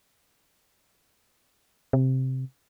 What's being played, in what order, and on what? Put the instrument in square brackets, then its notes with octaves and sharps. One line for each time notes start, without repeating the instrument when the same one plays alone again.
[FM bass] C3